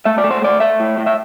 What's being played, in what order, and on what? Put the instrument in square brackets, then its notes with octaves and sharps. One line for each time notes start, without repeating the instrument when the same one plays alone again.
[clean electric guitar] A3 E5
D5
A3
C5
A3 D5
A3 E5
A2
A2
E5